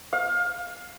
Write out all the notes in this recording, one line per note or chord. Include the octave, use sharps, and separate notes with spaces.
F5